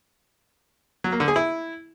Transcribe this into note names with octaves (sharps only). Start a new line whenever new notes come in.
F#3
A#3
D3
G#4
E4